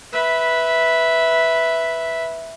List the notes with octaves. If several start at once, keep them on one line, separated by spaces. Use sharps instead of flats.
B4 E5